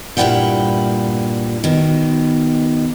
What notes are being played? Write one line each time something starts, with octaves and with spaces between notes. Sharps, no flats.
G2 A#2 D4 E4 F#5 G5
B2 D#3